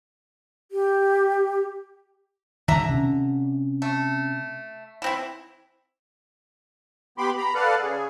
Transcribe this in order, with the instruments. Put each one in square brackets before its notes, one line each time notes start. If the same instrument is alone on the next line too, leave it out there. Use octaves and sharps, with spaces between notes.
[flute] G4
[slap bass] G2 D#3 [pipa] D3 E5 A#5
[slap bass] C3 C#4
[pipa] A3
E3 C4 E4
[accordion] B3 G4 B5 C6 D6
A#5 B5
A4 B4 D5 F5 F#5
C#3 G#4